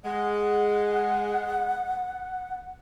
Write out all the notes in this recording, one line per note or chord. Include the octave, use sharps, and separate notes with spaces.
G#3 F#5